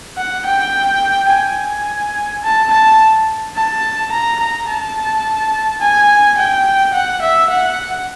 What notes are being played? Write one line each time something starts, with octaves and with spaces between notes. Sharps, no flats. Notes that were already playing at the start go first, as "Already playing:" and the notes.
F#5
G5
G#5
A5
A5
A5
A#5
A#5
A5
G#5
G5
F#5
E5
F#5